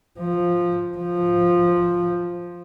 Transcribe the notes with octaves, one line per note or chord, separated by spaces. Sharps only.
F3
F3